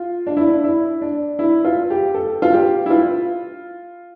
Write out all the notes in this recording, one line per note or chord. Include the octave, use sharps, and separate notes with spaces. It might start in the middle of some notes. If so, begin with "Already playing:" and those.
Already playing: F4
D4
E4
D4
E4
D4
E4
F4
G4
A4
F4
G4
E4
F4